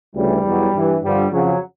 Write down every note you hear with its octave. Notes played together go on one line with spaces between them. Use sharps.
D2 C#3 E3 G3
E2 B2 F#3
G2 E3
G2 D3 F3 G3
F2 C#3 F3 F#3